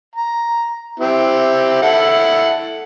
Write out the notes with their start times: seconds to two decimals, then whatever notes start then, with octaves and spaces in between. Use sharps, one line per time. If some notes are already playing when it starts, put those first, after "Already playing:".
0.16 A#5
1.00 C4 E4 G4
1.82 E4 A4 F#5